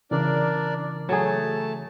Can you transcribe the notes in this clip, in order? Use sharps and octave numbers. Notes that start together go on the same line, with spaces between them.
C#3 E3 D4 A#4 D5
F#3 A3 G#4 A5